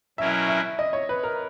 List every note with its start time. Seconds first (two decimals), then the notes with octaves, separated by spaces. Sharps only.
0.18 B2 F#3 C#4 E4 A#4 E5
0.48 E5
0.79 D#5
0.93 C#5
1.09 B4
1.23 A#4